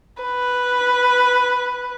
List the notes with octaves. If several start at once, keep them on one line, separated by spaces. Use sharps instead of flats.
B4